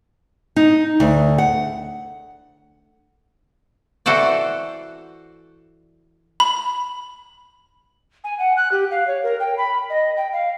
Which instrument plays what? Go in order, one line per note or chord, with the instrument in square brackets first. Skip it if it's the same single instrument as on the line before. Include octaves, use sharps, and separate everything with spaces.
[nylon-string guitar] D#4
D2
F#5
[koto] E3 F#4 A4 C5 D5
[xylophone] B5
[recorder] G#5
F#5
F#6
G4
F5
C#5
A#4
G5
B5
D#5
G5
F5